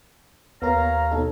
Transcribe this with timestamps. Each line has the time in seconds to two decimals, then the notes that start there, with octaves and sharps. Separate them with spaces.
0.62 D#2 B3 A#4 C#5 F5 A#5
1.12 B2 D#4 A4